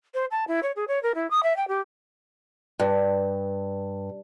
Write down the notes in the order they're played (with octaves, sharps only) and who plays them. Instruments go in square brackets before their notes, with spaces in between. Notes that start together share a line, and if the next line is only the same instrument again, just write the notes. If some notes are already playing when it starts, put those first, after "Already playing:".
[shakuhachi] C5
A5
E4
C#5
G#4
C#5
A#4
E4
D#6
E5
G5
G4
[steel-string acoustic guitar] G2